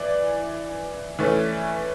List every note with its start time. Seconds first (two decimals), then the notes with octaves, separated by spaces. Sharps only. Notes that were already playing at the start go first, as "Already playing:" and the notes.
Already playing: E3 D5
1.19 E3 A3 C#4